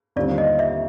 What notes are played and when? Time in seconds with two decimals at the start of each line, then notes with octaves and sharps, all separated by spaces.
0.16 D#2 D3 G3 C4 F4 D5
0.38 D#5
0.59 E5